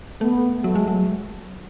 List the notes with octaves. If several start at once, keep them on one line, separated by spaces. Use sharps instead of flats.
A3 B3
F#3 A3
G#3
F#3